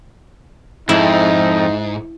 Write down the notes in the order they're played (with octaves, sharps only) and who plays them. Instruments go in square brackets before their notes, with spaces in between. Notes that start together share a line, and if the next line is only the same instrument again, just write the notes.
[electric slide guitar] F2 [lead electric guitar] G#2 [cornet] D#4 [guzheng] E4